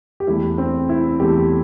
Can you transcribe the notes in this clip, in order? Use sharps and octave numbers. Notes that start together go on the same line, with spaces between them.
G4
E2 E3 A3 E4
C4
E4
E2 E3 A3 G4